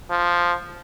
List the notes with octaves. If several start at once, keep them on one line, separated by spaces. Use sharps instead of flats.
F3